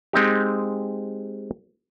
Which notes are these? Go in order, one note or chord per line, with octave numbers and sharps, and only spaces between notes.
G#3 C4 D#4 G4